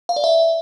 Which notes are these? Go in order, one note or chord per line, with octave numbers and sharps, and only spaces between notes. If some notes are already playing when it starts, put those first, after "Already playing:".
F5
D5
E5